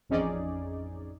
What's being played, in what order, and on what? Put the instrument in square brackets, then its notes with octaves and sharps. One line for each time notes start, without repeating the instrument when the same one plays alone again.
[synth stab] A1 F2 C#4 D#4 G#4 D5